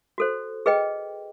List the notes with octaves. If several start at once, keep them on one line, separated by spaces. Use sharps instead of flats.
F#4 A4 C5
G#4 B4 D#5 G5